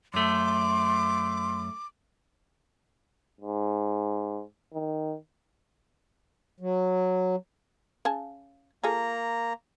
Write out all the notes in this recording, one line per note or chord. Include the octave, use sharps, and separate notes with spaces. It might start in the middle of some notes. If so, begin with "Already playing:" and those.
F#2 A3 C6 D6
G#2
D#3
F#3
C#3 G#5 A5
A#3 F4 G#4 A4 A#5